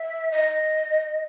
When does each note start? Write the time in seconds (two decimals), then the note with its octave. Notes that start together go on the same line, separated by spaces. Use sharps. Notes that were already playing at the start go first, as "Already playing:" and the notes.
Already playing: E5
0.31 D#5